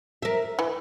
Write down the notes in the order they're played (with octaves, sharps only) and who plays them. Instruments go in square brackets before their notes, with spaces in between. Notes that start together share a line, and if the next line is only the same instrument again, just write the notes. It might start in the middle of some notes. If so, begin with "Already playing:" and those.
[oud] A#4 E5
[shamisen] E3